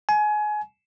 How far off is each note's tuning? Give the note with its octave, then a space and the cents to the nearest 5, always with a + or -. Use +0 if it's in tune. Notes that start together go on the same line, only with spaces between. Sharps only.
G#5 +25